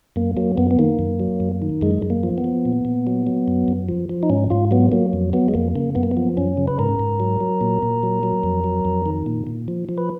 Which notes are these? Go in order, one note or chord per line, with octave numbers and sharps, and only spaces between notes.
F#2 A#3
F#3 A#3
F#2 B3
B3
D#3 A#3
F#2
F#3
F#2
D#3
F#2 G#3
F#2
A#3
F3
B3
F3
A#2
A#2
F#3
F#3
F#2
F#2
F3
F3
D#4
G#2 C#4
G#2 F4
F#3 B3
F#3 A#3
F2
F#3 B3
G#3
F2 A#3
C#3 A#3
F#2 B3
A#3
B3
F3
F#2 C#4
C#3
B4
G#2 A#4
G#2
F#3
F#3
A#2
A#2
F#3
F#3
F2
F#3
F2
D#3
A#2
A#2
F3
F3
B4